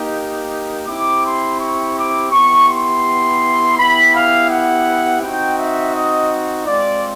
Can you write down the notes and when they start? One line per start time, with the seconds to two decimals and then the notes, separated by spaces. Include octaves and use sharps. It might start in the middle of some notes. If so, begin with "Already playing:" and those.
Already playing: A#3 D#4 G4
0.87 C4 E4 G4 D6
1.25 C6
1.60 C#6
1.97 D6
2.32 B3 E4 G4 C#6
2.68 C6
3.77 B3 E4 G4 B5
4.14 F5
4.50 F#5
5.21 C4 D#4 F#4 G5
5.58 E5
5.93 D#5
6.66 G#3 C4 F4 D5